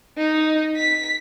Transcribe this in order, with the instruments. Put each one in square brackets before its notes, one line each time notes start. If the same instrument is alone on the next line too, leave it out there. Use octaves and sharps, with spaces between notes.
[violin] D#4
B6